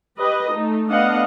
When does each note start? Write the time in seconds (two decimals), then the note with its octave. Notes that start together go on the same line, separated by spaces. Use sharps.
0.18 G4 B4 D#5
0.53 A3 D#4
0.89 A3 B3 D4 D#5 F5 F#5